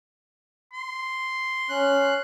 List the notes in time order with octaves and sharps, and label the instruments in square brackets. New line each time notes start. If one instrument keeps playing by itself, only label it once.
[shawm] C6
[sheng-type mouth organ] C#4 F#6